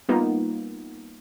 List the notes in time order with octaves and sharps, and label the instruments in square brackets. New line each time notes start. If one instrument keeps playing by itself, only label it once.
[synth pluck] G3 A#3 B3 D#4 F4